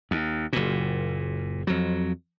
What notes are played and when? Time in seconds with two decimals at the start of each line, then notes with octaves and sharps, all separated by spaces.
0.11 D#2
0.53 F#1 A#2
1.67 F2 F#3